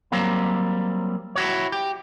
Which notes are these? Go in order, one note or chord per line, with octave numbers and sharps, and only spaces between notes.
F#3 G3 A#3 C4
E4 F#4 C#5
G4